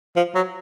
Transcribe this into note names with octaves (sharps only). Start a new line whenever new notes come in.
F3
F#3